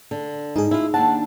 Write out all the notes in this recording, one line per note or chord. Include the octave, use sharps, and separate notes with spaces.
D3
G#2 D#4 G#4
E4 F4
D#2 D4 F#5 A5